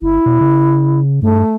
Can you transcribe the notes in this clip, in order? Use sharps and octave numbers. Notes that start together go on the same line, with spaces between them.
G1 E4
B2
C#3
G2 A3